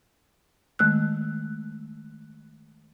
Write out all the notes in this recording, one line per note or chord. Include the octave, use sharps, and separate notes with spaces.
D#3 G#3 A3 E6 F#6